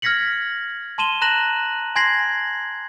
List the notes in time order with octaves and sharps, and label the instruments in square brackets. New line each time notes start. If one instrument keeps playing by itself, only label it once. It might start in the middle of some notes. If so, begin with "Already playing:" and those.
[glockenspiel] F6 G#6 A#6 B6 C#7 F#7
A5 C6 D#7 E7 G7
A#5 F#6 A#6 E7 F#7
G#5 C6 G#6 A#6 C7 F#7